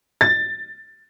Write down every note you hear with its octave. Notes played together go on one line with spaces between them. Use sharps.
A6